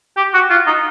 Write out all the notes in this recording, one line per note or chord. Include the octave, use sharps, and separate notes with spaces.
G4
F#4
F4
D#4